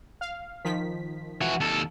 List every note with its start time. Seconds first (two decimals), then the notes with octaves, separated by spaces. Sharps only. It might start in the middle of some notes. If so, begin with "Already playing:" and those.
0.21 F5
0.65 D#3 F3 B6
1.41 E3 F#4
1.60 D#2 A4